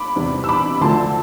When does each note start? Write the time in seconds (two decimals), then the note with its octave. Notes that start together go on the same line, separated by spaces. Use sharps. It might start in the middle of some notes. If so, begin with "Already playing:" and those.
Already playing: B5 D6
0.16 E2 C3 G3
0.44 E6
0.49 B5 D6
0.81 D2 D3 F3 A3 A5 C6